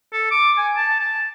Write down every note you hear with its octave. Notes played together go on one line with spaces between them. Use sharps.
A4
D6
G#5
A5
A5